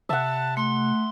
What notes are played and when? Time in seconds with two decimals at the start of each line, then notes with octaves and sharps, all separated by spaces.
0.09 C3 E5 F#5 A5
0.57 A3 C6